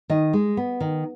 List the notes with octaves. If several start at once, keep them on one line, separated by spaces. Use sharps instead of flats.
D#3 D#5
G#3
B3
D#3